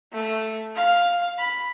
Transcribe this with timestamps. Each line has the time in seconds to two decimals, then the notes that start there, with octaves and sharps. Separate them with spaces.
0.13 A3
0.75 F5
1.38 B5